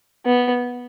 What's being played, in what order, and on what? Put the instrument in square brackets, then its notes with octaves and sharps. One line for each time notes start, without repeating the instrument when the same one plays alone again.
[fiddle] B3